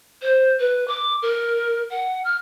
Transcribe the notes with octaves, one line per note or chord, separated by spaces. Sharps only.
C5
B4
D6
A#4
F#5
F6